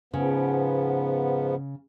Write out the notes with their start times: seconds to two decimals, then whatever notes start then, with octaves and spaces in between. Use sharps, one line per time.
0.13 G#2 C#3 F3 B3